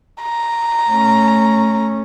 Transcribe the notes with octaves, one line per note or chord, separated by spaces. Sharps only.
A#5
A3 C#4